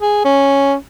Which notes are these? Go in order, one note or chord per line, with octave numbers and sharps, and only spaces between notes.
G#4
C#4